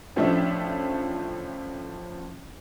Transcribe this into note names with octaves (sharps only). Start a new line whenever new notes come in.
A1 F3 A3 D4 E5